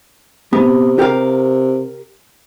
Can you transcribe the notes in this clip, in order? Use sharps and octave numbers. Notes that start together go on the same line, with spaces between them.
C3 B3
G4 A#4 F5